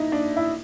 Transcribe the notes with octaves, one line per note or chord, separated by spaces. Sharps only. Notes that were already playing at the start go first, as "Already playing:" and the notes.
Already playing: D#4 E4
D4
E4